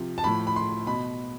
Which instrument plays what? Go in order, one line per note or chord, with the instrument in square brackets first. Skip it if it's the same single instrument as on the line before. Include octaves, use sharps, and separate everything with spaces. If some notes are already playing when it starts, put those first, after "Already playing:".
Already playing: [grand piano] C3 F3
A5
A2 F3 B5
B5
C6
B2 B5